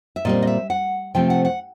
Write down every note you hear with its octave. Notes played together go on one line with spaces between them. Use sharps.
E5
A#2 G3 C4 D#5
D#5
E5
F#5
C3 F3 A3 C4 G5
F#5
F#5